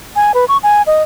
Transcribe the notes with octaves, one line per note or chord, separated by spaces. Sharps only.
G#5
B4
C#6
G#5
D#5